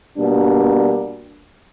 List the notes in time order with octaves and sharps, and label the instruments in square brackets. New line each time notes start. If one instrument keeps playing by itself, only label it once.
[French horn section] B2 G3 A#3 D4